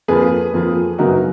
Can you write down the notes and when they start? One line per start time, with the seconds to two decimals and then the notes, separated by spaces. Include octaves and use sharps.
0.08 F2 F3 A#3 G#4 B4
0.53 F2 F3 A#3
0.98 F#2 C#3 F#3 B3 D#4 F#4 A#4